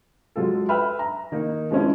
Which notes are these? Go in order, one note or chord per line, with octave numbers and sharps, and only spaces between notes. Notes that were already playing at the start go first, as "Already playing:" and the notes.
F#3 G#3 F4 A4
B4 E5 G5 B5 F6
A#5
D#3 A#3 D#4
F3 G#3 B3 C#4 E4